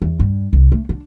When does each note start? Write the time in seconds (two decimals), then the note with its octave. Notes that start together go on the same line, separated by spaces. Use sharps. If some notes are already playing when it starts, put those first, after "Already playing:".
0.02 E2
0.20 G2
0.53 C2
0.72 A3
0.89 D4